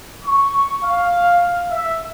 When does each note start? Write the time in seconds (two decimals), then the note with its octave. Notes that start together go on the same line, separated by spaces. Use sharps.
0.22 C#6
0.83 F5
1.70 E5